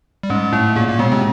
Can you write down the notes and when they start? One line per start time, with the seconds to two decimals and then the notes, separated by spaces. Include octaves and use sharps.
0.23 G3
0.30 G#2 G#3 C#4
0.52 A2 A3 E4
0.76 A#2 A#3 G#4
0.88 A#2 A#3
0.99 B2 G#3 B3
1.12 C3 C4